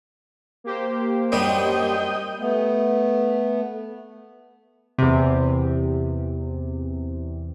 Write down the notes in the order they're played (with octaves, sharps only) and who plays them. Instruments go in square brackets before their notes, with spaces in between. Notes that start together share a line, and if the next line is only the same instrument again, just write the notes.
[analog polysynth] A#3 G4 C5
[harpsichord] F#2 G3 D4 [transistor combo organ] D#5 G5
[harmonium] A3 B3
[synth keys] E2 C3